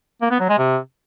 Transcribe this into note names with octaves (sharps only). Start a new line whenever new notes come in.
A#3
B3
F#3
G#3
C3